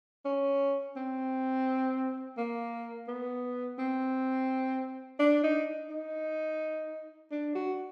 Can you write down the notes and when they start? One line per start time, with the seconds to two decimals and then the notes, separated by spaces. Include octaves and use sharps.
0.25 C#4
0.96 C4
2.37 A#3
3.08 B3
3.79 C4
5.19 D4
5.43 D#4
5.90 D#4
7.31 D4
7.55 F#4